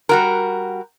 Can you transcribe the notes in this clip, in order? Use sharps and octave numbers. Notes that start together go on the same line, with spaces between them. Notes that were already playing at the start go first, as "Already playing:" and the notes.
G3 F#4 A#4